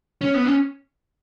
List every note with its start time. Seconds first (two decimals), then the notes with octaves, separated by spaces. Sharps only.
0.21 C#4
0.34 B3
0.46 C#4